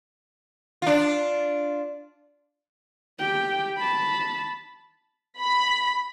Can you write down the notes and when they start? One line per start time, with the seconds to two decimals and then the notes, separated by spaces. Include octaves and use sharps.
0.82 D4 F4
3.19 G4 G5
3.78 A5 B5
5.39 B5